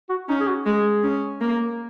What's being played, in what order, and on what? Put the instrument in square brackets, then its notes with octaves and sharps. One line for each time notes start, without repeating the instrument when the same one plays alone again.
[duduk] F#4
[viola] C#4 [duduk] D#4
[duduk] G#4
F#4
[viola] G#3 [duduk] G#4
[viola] C#4
A#3